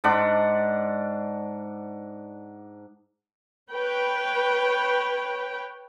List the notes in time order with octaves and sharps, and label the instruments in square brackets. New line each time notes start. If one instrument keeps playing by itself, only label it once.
[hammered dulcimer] G#2 D4 F#5 D6
[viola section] B4 C#5 G5